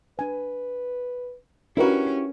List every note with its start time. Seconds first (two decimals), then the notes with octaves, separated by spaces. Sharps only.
0.19 D4 B4 G#5
1.77 C#4 D4 E4 F#4 G4 A#4 B4